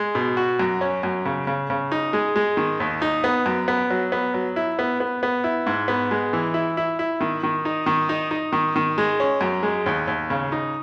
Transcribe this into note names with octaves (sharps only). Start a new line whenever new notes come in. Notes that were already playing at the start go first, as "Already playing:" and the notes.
Already playing: G#3
B2
F#4
F#2
C#4
F#2
C#3
C#3
C#3
D#4
G#3
G#3
D#3
D#2
D#4
B3
F#2
B3
F#3
B3
F#3
E4
B3
B3
B3
E4
G#2
B3
G#3
E3
E4
E4
E4
D#3
D#3
D#4
D#3
D#4
D#4
D#3
D#3
G#3
C#4
F#2
G#3
D#2
D#2
C#3
D#4